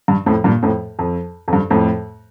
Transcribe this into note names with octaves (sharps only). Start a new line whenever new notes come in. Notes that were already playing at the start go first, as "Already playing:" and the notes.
G2
F2 A2
G2 A#2
F2 A2
F2
F2
G2
F2 A2